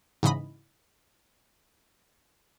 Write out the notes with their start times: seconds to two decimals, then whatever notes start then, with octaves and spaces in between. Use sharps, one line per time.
0.23 G#2 C#3 E3 D#5 B5